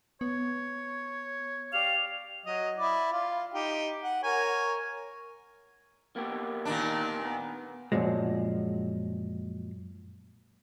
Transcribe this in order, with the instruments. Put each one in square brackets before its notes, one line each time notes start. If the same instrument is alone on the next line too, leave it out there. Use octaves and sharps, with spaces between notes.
[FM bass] B3 [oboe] C#5
[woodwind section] G4 D5 F5 [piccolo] F7
[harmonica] F#3 D#5
E4 D5
F4
D#4 G4 G5
F#5
A#4 C#5 G#5
[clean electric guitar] A#3 B3 G4
[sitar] A#2 D#3 D4
[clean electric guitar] B3
[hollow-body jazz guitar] F#2 A#2 F3 F#3 G#3